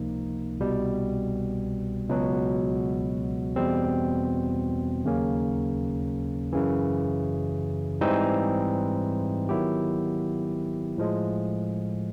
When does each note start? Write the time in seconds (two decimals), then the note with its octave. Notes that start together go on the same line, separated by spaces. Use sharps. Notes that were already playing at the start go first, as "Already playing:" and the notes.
Already playing: C#2 C3 F3 A#3 D#4
0.60 C2 B2 G3
2.09 C#2 B2 F#3
3.56 E2 B2 G3 C4
5.05 D#2 C#3 F#3 A#3 C#4
6.53 F#2 C#3 E3
8.01 G#2 E3 G3 C4 D#4
9.49 D#3 F#3 B3 E4 G4
10.98 A2 F3 G#3